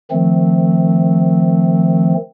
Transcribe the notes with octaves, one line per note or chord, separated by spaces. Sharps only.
D#3 F3 A3 C4